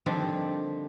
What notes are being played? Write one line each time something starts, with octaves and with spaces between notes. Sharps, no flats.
D3 D#3 F3 G3 C4